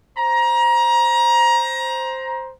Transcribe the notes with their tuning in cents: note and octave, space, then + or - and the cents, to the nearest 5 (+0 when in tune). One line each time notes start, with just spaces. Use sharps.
C5 +0 A#5 +25